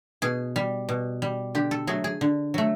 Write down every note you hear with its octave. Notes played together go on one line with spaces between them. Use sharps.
B2 G#4
G3
B2
G3
D3 G4
A4
F#3 A3 G#4
G#4
D3
F#3 A3